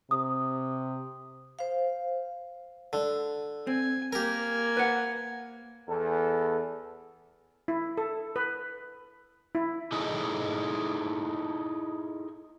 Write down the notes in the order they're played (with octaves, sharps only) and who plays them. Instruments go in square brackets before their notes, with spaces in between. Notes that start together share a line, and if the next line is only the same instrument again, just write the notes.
[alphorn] C3 [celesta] D#6
[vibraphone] C5 F5
[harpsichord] D3
[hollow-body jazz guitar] C4 [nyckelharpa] G#5
[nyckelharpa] A#3 G#5 [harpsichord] G4 A#4
[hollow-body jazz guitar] B4 C5 F#5
[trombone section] E2 A4
[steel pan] E4
A4
B4
E4
[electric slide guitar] D#4 E4 G#4 A4 D#5